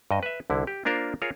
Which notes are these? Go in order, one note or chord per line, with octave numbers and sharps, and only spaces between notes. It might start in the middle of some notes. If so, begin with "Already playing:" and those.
G2 D#5
B4 E5
C2 D3 E4
G4
A#3 D4 F4 A#4 C5
F4 G#4 A#4 C#5